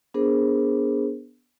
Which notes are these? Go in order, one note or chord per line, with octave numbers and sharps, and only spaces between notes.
B3 D4 G#4 A#4 C5